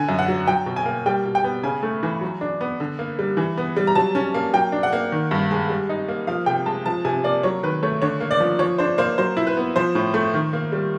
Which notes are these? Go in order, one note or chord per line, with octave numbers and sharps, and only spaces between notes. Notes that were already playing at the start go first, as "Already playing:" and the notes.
Already playing: D3 G#5
F#2
F#5
F#3
F#3 G5
B2
G#5
A#3
G3 G5
B2
G5
B3
C#3 G#5
A3
E3
F#3
D4
B3
D3
A#3
G3
E3
B3
G3
A#5
F#3 A5
C#4
A#3
F#3 G5
D4
F#5
A#3
D#3
G2
G#3
G3
D#4
A#3
F3 F5
C3 G5
G#3 A5
F3 A5
C3 G#5
A#3 D5
F#3 C#5
D#3 B4
A3 C#5
D3 C#5
A#3
D5
F3
F3 C#5
D4 C5
A#3 C5
F#3 C5
E4
B4
B3
F3 C5
A2
A3
D#3
A#3
G3